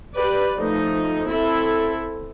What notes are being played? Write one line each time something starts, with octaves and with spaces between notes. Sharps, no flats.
G4 B4 D5
F3 A3 D#4
C4 E4 A4